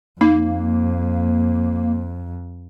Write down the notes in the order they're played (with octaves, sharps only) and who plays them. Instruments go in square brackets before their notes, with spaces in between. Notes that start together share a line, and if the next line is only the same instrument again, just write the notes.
[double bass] F2 [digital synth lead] A#3 [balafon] D#4